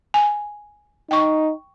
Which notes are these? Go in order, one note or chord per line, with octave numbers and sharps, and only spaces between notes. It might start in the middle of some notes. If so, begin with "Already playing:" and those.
G#5
D#4 G5 C#6